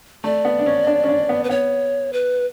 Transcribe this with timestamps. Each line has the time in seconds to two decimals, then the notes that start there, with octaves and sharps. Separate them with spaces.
0.24 A3 D5
0.45 B3
0.59 D4
0.66 C#4
0.87 D4
1.04 C#4
1.09 D4
1.29 B3
1.44 B4
1.49 B3 C#5
2.13 B4